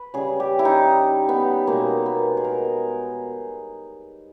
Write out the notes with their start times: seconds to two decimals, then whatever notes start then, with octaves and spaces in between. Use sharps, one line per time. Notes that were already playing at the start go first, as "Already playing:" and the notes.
Already playing: B4
0.14 C#3 G3 G#4
0.40 G4
0.59 E4
0.65 D#4
1.29 B3
1.67 B2 G#3 A#3
2.06 B3
2.37 G#4
2.44 A#4